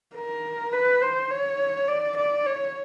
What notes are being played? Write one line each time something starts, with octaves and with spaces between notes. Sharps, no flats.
A#4
B4
C5
C#5
D5
D5
C#5